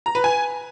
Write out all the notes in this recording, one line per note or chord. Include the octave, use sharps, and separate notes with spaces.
A#5
B4
G#5